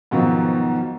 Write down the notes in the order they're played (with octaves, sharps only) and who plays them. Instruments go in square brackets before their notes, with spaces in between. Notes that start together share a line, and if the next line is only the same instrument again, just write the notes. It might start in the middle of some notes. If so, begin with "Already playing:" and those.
[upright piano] G#2 B2 D#3 F3 F#3